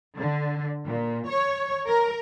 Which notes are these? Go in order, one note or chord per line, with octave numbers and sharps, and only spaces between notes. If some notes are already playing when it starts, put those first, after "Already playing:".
D3
A#2
C#5
A#4